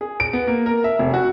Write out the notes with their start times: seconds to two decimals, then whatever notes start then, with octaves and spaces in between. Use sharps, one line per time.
0.01 G#4
0.20 D7
0.33 B3
0.47 A#3
0.66 A#4
0.84 E5
0.99 F1
1.14 F#4